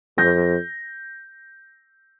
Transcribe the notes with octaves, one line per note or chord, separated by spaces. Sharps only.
F2 G6 A#6